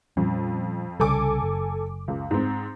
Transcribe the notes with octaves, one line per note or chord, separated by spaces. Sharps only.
F2 A#2 G3 C#4
C2 C#3 G3 A4 G#5 D6
F#1
C#2
G#2 C4